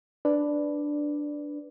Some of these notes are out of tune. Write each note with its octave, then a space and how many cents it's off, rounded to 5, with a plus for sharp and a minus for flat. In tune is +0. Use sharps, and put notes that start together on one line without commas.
D4 +0 B4 +0 D5 +0